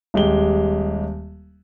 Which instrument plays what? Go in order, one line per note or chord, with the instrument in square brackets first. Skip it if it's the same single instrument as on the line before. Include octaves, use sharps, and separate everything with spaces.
[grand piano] D#1 G#3 G4 G7